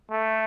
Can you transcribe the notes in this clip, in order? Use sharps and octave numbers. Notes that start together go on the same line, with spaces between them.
A3